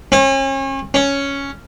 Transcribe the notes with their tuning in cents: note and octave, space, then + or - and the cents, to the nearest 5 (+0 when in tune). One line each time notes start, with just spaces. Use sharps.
C#4 -35
C#4 +5